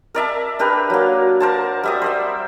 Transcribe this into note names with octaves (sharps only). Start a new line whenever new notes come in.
A#4 D5 E5 A5
D4 G4 A#4 B4
F#3 A#3
A#4 C5 A5
G3 E5 D#6
C5 D5 E5